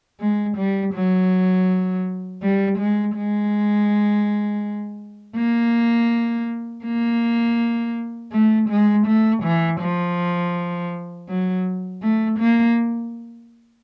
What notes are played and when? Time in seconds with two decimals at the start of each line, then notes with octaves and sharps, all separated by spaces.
0.20 G#3
0.57 G3
0.94 F#3
2.42 G3
2.79 G#3
3.16 G#3
5.37 A#3
6.85 A#3
8.32 A3
8.69 G#3
9.07 A3
9.43 E3
9.81 F3
11.29 F#3
12.02 A3
12.39 A#3